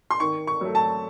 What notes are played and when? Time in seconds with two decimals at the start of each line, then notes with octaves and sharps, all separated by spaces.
0.11 C6
0.20 D#3 C#6
0.47 C#6
0.61 F#3 A3
0.75 A5